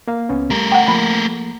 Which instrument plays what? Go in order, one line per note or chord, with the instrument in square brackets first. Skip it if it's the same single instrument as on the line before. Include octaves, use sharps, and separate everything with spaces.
[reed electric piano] A#3 F5
C#2 B3 C#4
[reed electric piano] G3 [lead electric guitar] A3 A#4
[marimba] F#5 G5
[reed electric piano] F3 A#3 [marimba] B5